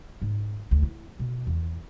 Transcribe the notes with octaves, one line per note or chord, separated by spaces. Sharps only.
G#2
D2
E4
B2
E2